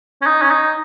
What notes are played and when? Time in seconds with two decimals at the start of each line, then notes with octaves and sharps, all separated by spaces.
0.22 C#4
0.26 D#4
0.42 C#4
0.51 D#4